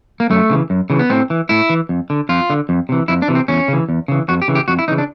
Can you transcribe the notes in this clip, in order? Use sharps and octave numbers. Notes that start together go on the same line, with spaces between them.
A#3
F#2 A3
C#3 E3
F#2
C#3 E3
B3
A2 C4
E3
A2 E4
E3
F2
D3
F2 F4
D3
F2
C3 E3
F2 E4
D4
C3 E3
C4
E2 C#4
C#3 E3
E2
C#3 E3
F2 F#4
G4
C#3 E3
G4
F2 F#4
E4
C#3 E3 D#4
D4